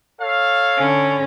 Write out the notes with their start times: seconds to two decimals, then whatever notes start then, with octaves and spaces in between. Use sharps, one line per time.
0.20 A4 C#5 F5
0.76 D3 C#4